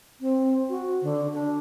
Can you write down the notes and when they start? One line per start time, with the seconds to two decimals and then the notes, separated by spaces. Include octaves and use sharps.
0.21 C4
0.70 F#4
1.03 D3
1.34 D4